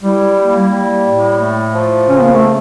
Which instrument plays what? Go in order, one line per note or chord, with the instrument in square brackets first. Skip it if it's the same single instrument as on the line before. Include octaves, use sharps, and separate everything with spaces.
[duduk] G3 [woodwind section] E4
[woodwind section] A#3
G3
A2
A3
F3
[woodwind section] C#3 [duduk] C#4
[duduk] A#3
A3